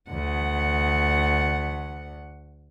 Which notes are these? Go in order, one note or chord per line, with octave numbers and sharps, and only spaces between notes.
D2 F#5